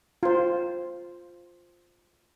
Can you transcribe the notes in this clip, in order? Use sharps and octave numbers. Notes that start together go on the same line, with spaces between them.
F4 C5